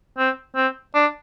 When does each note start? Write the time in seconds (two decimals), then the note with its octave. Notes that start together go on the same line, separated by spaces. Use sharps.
0.18 C4
0.56 C4
0.95 D4